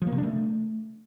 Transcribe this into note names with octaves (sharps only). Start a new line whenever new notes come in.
F3
A#3
C3
D4
A3